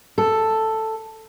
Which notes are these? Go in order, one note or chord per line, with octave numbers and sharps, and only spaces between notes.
A4